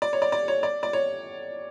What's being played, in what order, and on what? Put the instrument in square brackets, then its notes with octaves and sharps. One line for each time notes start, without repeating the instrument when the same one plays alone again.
[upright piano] D5
C#5
D5
D5
C#5
D5
D5
C#5